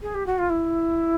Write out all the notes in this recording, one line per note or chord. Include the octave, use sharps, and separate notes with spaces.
G#4
G4
F#4
F4
E4